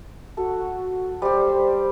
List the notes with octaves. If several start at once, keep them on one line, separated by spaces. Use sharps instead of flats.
F#4 A4
G3 G4 C5